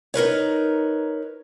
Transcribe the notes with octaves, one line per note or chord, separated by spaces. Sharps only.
D#4 A#4 B4 C#5